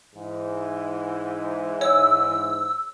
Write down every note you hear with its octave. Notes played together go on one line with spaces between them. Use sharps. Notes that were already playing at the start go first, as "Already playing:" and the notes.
G#2 E3
C#5 E6